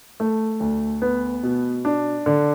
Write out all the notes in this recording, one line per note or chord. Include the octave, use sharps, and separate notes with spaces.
A3
D2
B3
B2
D4
D3